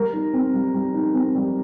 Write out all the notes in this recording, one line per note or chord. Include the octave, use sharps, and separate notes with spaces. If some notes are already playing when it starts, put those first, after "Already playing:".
Already playing: G3 A#4
D#4
C4
G3
G3
D#4
C4
G3